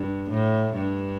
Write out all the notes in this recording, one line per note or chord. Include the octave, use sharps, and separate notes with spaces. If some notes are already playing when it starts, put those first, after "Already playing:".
Already playing: G2
A2
G2